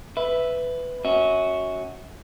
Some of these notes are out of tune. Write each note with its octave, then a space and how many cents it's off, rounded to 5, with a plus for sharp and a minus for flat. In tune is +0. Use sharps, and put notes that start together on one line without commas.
B4 +10 E5 +0
C#4 +0 F#4 +0 E5 -35